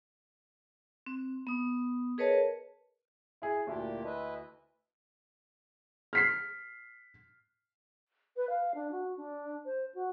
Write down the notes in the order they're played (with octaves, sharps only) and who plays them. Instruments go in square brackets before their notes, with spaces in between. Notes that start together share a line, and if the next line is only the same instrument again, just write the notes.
[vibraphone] C4
B3 D#6
G#4 A#4 B4 C#5 D#5 A5
[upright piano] E4 G#4
[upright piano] D2 E4 [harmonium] A#2 D4 G4
[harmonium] B4 D#5 E5
[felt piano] F6 B6 C7
[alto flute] B4
F5
D4
F#4
D4
C5
F#4